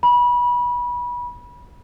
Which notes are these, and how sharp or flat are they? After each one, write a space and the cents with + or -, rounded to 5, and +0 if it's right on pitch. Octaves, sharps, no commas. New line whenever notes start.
B5 -25